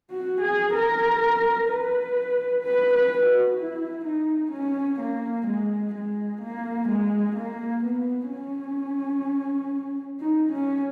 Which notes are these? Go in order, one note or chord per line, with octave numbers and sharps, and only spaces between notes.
F#4
G#4
A#4
B4
B4
B4
F#4
E4
D#4
C#4
A#3
G#3
G#3
A#3
G#3
A#3
B3
C#4
D#4
C#4